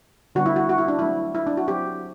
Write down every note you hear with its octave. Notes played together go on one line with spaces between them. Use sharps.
D3 G3 B3 F#4
E4
F#4
F#4
E4
D4
F#3 A3 C4 E4
E4
D4
F#4
F#3 C4 G4